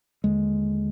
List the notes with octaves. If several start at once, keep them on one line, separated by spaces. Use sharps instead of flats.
D#2 D3 G#3